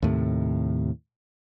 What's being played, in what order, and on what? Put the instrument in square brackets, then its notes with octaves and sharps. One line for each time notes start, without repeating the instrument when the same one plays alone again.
[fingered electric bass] D#2 A2 C3